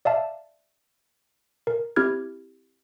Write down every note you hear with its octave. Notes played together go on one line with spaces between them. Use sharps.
D5 E5 F5 A5
A#4
C4 E4 G4 F6 G#6